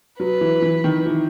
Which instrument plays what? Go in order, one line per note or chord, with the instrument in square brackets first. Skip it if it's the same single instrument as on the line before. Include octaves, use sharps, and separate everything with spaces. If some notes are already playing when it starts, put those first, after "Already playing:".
[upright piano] F#3 [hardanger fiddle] B4
[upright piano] E3
E3
D#3
E3